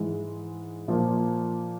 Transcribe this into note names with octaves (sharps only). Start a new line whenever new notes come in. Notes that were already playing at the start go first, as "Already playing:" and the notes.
Already playing: G#2 E3 G#3
A#2 F3 A#3